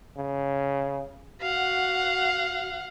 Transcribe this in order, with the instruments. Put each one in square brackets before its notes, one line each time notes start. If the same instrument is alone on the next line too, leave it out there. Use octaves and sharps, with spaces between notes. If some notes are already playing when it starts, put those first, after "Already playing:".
[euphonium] C#3
[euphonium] F#4 [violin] F5 F#5